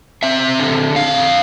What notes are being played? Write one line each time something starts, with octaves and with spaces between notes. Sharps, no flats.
C4 E5
D3
F2 F5